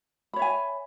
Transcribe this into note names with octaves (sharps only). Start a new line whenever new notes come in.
C#5 E5 G#5 B5